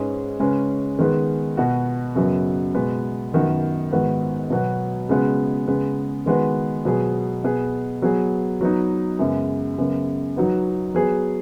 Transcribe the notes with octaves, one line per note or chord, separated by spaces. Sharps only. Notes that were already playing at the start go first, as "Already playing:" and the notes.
Already playing: G#2 G#3 C#4 G#4 B4
C#3 G#3 C#4 B4
D#3 G#3 B3 G#4 B4
B2 B3 F#4
F#2 C#3 F#3 B3
B2 G#3 B3 F#4
F#2 D#3 B3 F#4
G#2 D#3 B3 F#4 B4
B2 F#3 B3 F#4 B4
C#3 G#3 B3 F#4 B4
C#3 G#3 B3
D#3 G#3 B3 F#4 B4
B2 F#3 B3 G#4
B2 B3 G#4
F#3 B3 G#4 B4
F#3 B3 D#4
F#2 C#3 G#3 B3
F#2 C#3 B3
F#3 D#4 F#4 B4
F#3 B3 G#4 B4